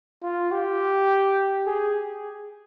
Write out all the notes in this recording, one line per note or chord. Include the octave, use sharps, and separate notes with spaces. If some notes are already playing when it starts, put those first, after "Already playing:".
F4
G4
G#4